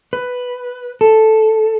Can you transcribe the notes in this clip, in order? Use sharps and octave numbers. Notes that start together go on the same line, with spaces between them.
B4
A4